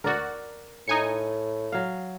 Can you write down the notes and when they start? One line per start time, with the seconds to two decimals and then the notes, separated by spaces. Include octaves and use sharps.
0.04 D2 F#4 A#4 D5
0.88 A2 D#4 G#5 C#7
1.72 F#3 F5